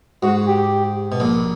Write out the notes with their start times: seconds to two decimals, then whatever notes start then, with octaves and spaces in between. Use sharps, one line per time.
0.22 G#2 F#4
0.47 G4
1.12 B2
1.20 A#1 A#2